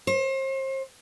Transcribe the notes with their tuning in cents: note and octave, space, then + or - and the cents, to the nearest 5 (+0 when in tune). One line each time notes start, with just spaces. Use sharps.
C5 +35